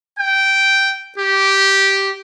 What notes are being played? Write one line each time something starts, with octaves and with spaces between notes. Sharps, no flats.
G5
G4